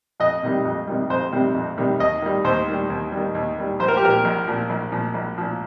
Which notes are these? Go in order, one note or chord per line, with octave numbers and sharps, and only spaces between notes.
F2 D#5
C3 D#3 G3
F2
C3 D#3 G3
F2 C5
C3 D#3 G3
F2
C3 D#3 G3
D#2 D#5
D#3 G3
D#2 C5
D#3 G3
D#2
G3
D#3
D#2
D#3 G3
A#1 C5
A#4
G4
A#2 F3 A#4
A#1
A#2 F3
A#1
A#2 F3
A#1
A#2 F3